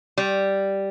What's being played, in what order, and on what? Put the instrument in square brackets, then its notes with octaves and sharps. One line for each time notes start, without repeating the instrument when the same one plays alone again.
[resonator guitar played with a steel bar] G3